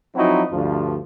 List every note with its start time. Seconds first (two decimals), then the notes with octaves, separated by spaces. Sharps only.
0.15 F3 F#3 C4 D#4 E4 F#4
0.52 D2 G2 F3